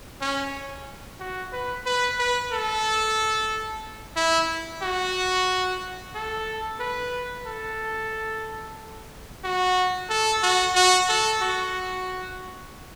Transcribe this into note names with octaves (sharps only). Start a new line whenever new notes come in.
C#4
F#4
B4
B4
B4
A4
E4
F#4
A4
B4
A4
F#4
A4
F#4
F#4
A4
F#4